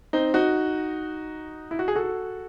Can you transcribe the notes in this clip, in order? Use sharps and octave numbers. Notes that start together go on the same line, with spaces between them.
C4 D#4
D#4 F#4
E4
F#4
G#4
F#4 A4